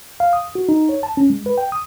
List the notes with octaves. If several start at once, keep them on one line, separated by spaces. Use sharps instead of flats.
F5
D#6
F#4
D#4
C#5
A5
C#4
G#3
B4
G5
D#6